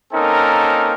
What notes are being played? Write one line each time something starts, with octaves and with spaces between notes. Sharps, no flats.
A#3 C4 C#4 D#4 A4 A#4